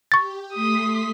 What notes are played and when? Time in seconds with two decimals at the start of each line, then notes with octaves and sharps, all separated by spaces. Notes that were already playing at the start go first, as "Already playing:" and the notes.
0.12 G4 C#6 A6
0.53 A3 C6 D#6 B6